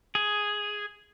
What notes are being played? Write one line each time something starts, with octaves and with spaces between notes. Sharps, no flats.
G#4